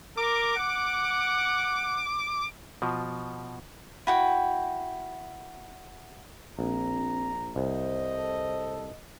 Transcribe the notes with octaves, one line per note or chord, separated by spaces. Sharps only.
A#4 D6
F#5
B2 F3
E4 F#4 G5
A#1 C4 A#5
C2 C5 D#5
A4